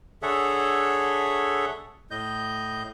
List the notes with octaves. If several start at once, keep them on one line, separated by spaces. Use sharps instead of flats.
D3 G#4 A4 C#5 E5 F#5
A2 D#5 G6